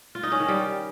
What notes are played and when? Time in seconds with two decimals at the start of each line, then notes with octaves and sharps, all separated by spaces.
0.15 F4
0.23 D#4
0.32 C#4
0.40 D#3
0.48 G3